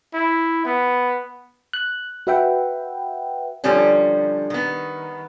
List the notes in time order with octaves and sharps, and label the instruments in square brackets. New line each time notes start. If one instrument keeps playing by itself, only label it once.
[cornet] E4
B3
[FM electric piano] F#6
F#4 B4 E5 F#5 G5
[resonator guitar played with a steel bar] D3 F3 G3 C#4
D#3 B3